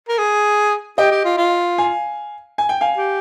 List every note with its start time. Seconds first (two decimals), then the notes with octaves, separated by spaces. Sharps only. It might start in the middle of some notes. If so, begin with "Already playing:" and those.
0.09 A#4
0.18 G#4
0.98 G4 D#5 G5
1.11 G4
1.25 F4
1.37 F4
1.78 F5 G#5
2.58 G#5
2.69 G5
2.81 F5 G#5
2.97 G4